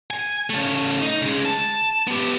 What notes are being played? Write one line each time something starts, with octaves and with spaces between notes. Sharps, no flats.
G#5
C#3 A3
D#4
C#3 G#3
A5
B3 G4